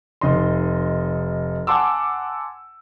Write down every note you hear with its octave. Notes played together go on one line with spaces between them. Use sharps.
F1 D#4 D#5 C6
F#5 G#5 A5 C6 D6 E6